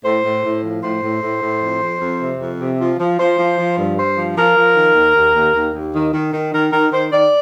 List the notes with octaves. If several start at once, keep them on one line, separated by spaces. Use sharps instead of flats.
A2 C5
A2
A2
F3
A2 C5
A2
A2
A2
F2
F2
F2
C3
F2
C3
F3
F3
F3 C5
F3
F3
G2
G2 C5
F3
F3 A#4
F3
D#3
D#2
D#2
D#2
D#2
D#2
D#3
D#3
D#3
D#3 A#4
D#3 A#4
D#3 C5
D#3 D5